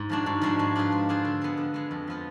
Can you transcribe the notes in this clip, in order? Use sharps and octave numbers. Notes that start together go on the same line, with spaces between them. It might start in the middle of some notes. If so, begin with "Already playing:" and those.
Already playing: G#2
F3 G#3 D4 F#4
G#2
F3 G#3 D4 F#4
G#3
D4 F4 G#4 B4
G#3
D4 F4 G#4 B4
D3
G#3 B3
D3
G#3 B3
F2
F3 B3 F4